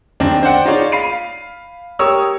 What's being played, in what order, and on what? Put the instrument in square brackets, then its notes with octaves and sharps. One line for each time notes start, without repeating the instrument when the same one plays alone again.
[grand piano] F#2 D#3 C4 D4
C5 D5 F#5 G5
D#4 F4 G#4 C#5 D5
F5 B5 C7 D#7
G4 A#4 C#5 C#6 D#6 E6